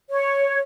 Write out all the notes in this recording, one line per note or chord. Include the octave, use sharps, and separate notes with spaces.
C#5